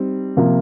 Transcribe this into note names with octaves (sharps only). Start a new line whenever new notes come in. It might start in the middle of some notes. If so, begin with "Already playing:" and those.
Already playing: G3 C4 D#4
C3 F3 A#3 F4